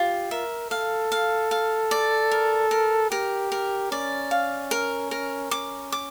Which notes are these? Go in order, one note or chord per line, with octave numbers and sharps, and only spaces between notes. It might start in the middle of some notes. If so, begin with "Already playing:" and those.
Already playing: F4 G4
A#4 E5
A4 F5
F5
F5
D5
A#4
A#4
G4 A#4
A#4
C#4 D5
F5
A#4
A#4
C#4 D6
D6